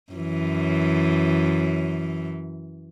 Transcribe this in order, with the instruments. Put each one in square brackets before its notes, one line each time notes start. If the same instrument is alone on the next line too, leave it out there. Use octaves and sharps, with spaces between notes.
[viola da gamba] F#2 E3